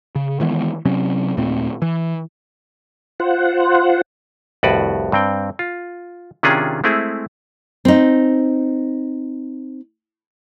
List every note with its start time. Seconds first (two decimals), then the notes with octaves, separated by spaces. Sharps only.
0.15 C#3
0.40 D#3 E3 G#3 B3
0.85 C3 F#3 C4 C#4
1.37 D#2 A#2 A3 C4
1.82 E3
3.20 F4 C5 F#5
4.63 C2 F2 A2 F#4 B4 D5
5.12 G2 C4 G5
5.59 F4
6.43 C3 D#3 C#4 D4 F4 G#4
6.84 G#3 A3 C4 E4 G#4
7.85 C4 D#4